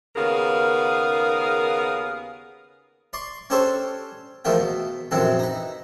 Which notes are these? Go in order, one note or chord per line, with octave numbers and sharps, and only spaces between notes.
D#2 C#3 B3 G#4 A#4 F5
D5 C6 C#6
C#4 D4 G4 A4 C5 C#5
E2 F3 A3 A#3 G5
B2
A#1 F#2 C3 E3 C4 A4
D#4 B4